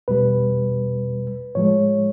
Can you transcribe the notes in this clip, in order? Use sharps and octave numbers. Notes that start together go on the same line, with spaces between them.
E2 B2 G3 B4
A2 F3 G#3 C#5